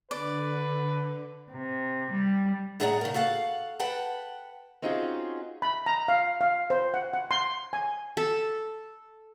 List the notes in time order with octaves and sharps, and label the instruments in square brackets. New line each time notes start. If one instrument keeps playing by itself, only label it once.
[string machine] D3 [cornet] B4 [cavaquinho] D5
[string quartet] C3
G3
[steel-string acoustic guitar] A2 E4 G#4 D5 F#5 A#5
C#3 A#4
F#4 A4 F5 F#5
B4 F#5 G5 A5
C4 C#4 D#4 F4 F#4 G#4
[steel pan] B5
A#5
F5
F5
C5
F#5
F#5
C6
G#5
[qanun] A4